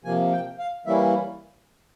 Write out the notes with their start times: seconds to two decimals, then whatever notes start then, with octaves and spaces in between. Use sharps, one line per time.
0.04 C3 F3 A#3 G#5
0.32 G5
0.59 F5
0.86 E3 G3 A#3 C#4 E4 E5